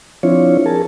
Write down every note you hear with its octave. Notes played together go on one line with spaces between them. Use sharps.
F3 C4 D4 E4 F4 C#5
G#4 A#4 A5